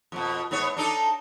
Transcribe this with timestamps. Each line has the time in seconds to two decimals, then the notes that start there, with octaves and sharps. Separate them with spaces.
0.12 F2 B2
0.51 G#2 B3 C#5
0.77 D4 D#4 A4